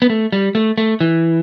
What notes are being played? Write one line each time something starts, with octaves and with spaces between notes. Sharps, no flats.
B3
A3
G3
A3
A3
E3